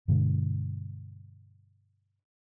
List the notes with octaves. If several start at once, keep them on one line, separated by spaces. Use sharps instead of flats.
G2 B2 D3 G#3